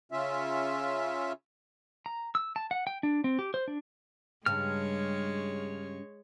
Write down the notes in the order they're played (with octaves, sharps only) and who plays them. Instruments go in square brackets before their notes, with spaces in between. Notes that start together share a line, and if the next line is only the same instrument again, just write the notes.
[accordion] C#3 C#4 F4 E5
[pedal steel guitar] A#5
E6
A5
F#5
G5
D4
C4
G4
C5
D4
[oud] G2 C#3 [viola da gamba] G#3 C#5 [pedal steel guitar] F6